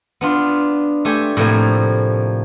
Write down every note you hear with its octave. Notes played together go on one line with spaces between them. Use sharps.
B3 D4 F4
A3 G4 G#5
A2 C3 F3 A#3 G#5